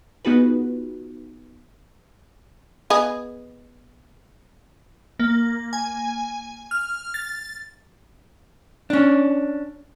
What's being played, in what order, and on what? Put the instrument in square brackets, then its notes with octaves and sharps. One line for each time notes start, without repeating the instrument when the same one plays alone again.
[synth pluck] B3 D#4 F4 F#4 G#4 B4
[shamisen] B3 G#4 D#5
[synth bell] A#3
G#5
F6
A6
[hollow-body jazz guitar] C#4 D4